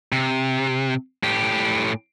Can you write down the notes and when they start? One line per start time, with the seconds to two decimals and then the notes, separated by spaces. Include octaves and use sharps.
0.12 C3
1.23 A2 G4